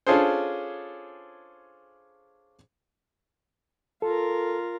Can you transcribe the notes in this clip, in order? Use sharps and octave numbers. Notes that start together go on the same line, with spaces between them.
C#4 D4 F4 G#4 A4 C5
F4 A4 A#4